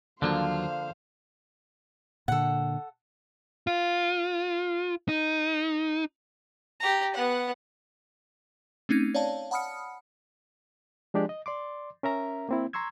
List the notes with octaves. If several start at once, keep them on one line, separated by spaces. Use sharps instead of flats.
D#2 D3 F3 F#3 A#3 D4 C5 F5
A#2 D3 A4 F#5
F4
D#4
G4 A#5
B3 F#5
A3 C4 C#4 D#4 G#6
C#5 D5 F5 A5
F#5 A5 B5 D#6 F6 C#7
F3 G#3 D4 G4 D5
D#5
D5 C6 D6
C#4 A#4 E5 A#5
A#3 C4 E4
A#5 C6 C#6 E6 G#6